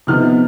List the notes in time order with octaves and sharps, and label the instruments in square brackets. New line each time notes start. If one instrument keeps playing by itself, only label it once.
[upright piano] C3 F3 B3 D#4 F6